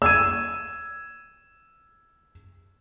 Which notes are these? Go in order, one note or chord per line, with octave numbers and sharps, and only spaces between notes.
E6 G#6 D#7